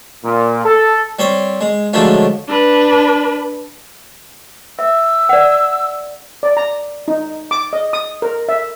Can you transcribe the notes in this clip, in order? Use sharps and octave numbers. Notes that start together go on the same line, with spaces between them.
A#2
A4
G3 C4 C#5
G#3
D3 F3 F#3 G#3 A3 C#4
D4 B4
E5 E6
D5 F#5
D5
A#5
D#4
D6
D#5
D#6
A#4
E5